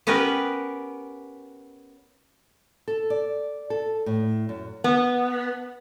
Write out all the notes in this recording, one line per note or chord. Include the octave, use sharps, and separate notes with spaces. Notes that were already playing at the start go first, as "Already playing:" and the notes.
B3 C#4 G4 A#4 B4
A4
D5
A4
A2
F#2
B3